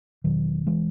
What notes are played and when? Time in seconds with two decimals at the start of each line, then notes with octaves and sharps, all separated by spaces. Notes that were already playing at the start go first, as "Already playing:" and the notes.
0.24 E1 E2 B2 D#3 F#3
0.67 E3 G#3